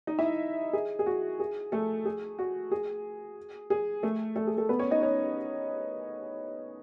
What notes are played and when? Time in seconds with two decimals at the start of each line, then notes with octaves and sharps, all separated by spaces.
0.07 D#4 D#5
0.19 E4 E5
0.73 G#4
0.99 G#4
1.06 F#4
1.40 G#4
1.72 A3 A4
2.05 G#4
2.39 F#4
2.72 G#4
3.70 G#4
4.03 A3 A4
4.36 A3 A4
4.47 G#4
4.58 A3 A4
4.69 B3 B4
4.79 C#4 C#5
4.91 D#4 D#5
5.02 C#4 C#5